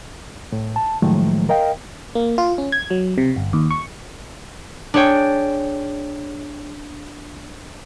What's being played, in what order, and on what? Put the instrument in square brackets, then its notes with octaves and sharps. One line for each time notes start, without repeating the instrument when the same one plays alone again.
[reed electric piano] A2
A5
A2 D#3 F3 F#3 G#3 A3
A#4 D#5 F5 G5
[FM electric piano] A#3
F4
C#4
G#6
F#3
C3
G1
D#2
C#6
[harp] D4 G#4 C#5 G5